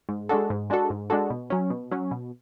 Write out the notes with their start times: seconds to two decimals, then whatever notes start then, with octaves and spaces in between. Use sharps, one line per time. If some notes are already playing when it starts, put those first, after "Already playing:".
0.09 G#2
0.29 G#3 D4 F#4 A4
0.50 G#2
0.70 G#3 D4 F#4 A4
0.90 G#2
1.10 G#3 D4 F#4 A4
1.30 B2
1.50 F#3 C#4
1.70 B2
1.91 F#3 C#4
2.11 B2